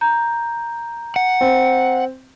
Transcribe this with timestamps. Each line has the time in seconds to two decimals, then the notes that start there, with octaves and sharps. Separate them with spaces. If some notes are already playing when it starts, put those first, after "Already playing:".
0.01 A#5 G6
1.16 F#5
1.41 C4